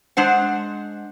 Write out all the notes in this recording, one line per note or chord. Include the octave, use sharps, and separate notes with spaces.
G#3 D4 C5 F#5